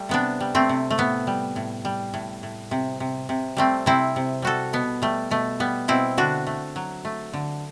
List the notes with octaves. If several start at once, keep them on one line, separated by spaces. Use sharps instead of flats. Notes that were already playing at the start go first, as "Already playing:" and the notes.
Already playing: G3 A3
C3 B3 D4
G3
A3 C4
C3
A3
A2 B3
G3
A2
G3
A2
A2
C3
C3
C3
G3 A3 C4
C3 C4 E4
C3
G3 F#4 A4
B2 B3
G3 A3
B2 A3
G3 B3
B2 C4 E4
D3 D4 F#4
A3
F#3
A3
D3